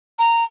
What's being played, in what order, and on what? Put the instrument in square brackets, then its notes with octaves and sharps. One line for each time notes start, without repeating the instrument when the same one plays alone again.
[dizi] A#5